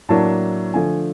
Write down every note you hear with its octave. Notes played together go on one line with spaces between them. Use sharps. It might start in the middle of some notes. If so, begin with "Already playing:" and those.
A2 F#3 A#3 D4 A5
D3 F3 A3 G#5